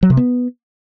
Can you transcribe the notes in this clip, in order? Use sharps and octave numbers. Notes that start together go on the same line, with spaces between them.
F#3
C3
B3